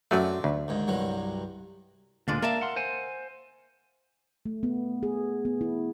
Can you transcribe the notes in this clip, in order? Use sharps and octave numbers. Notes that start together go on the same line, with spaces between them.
F#2 F#3 A3 C4 D5
D2
D#2 G#2
C2 G2 F#3
D2 A#2 G#3 D4 F4
A#3 A#4 D5 E5 F5 A5
F#5 C6
C5 F#5 G#5
A3
B3
G#4
B3
E4